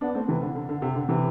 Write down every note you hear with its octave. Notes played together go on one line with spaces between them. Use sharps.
B3 D4
A3 C4
C3 E3
D3
D3
D3
C3
D3
C3 E3